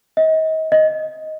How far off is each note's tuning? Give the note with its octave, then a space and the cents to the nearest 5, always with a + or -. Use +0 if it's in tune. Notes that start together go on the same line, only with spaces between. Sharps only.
D#5 +35
D#5 +5